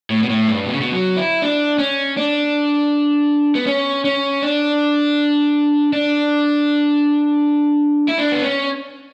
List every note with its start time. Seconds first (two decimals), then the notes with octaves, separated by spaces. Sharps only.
0.10 A2
0.23 B2
0.29 A2
0.48 G2
0.66 B2
0.74 C#3
0.81 B2
0.92 F#3
1.17 E4
1.42 D4
1.79 C#4
2.17 D4
3.55 B3
3.67 C#4
4.05 C#4
4.42 D4
5.93 D4
8.08 E4
8.18 D4
8.32 B3
8.43 C#4